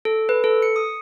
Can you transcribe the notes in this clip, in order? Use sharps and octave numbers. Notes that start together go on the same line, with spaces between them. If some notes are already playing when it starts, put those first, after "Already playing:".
A4
B4
A4
C#7
D#6